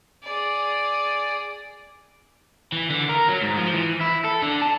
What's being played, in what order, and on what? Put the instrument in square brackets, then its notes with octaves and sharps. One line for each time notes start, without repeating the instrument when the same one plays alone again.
[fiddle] G#4 D5
[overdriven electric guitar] E3
D3
A#4
F#3
G#2
F3
E3
E4
A4
D3
A5